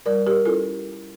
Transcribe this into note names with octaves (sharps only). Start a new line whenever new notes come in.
G3 A#4 D5
G4 A#4
C#4 E4 F4 A4